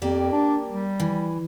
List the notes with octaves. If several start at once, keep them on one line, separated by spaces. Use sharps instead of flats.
F2 A#3 G4 D5
D4
G3
E3